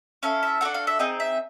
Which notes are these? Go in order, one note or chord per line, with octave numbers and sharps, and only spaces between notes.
C#4 E4 A4 F5
E5
D4 F#4 A4 F#5
F5
E5
C4 D#4 G#4 D#5
E5